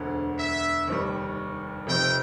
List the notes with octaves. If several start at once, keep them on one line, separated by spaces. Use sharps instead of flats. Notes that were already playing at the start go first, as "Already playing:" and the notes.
Already playing: E1 D2 D3
E5
F1 D#2 D#3 G3
F1 F2 C3 G5